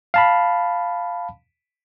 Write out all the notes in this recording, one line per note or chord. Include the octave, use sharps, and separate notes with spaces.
F5 A5 B5